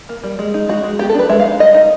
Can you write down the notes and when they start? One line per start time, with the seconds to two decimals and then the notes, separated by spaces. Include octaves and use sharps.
0.09 A#3
0.24 G3
0.39 G#3
0.54 D#4
0.69 G#3 F#4
0.84 G#3
0.99 B3 G4
1.09 A4
1.14 D4 B4
1.29 G#3 E5
1.40 F5
1.44 D#4
1.59 G3 D#5
1.74 D#4